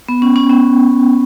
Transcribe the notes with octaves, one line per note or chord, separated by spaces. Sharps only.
B3
C#4
C#4
B3